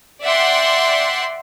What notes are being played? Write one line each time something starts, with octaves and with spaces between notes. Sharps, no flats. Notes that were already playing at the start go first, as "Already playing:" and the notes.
D5 E5 F#5 G5 C6